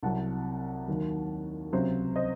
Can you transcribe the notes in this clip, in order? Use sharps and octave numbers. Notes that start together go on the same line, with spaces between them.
C2 C3 F#3 F#5 A5
D#2 D#3 F#3
C#2 C3 F#3 C5
C5 D#5